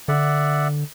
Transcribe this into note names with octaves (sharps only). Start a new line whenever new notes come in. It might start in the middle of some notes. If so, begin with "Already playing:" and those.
D3 D5 E5 F#5